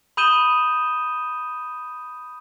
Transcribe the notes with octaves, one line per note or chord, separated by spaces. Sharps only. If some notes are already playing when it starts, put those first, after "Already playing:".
B5 D#6 G6 D#7 E7 G7